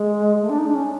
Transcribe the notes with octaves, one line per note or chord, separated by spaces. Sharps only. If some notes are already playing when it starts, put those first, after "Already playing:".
Already playing: G#3
A3
D4
D#4
D4
C#4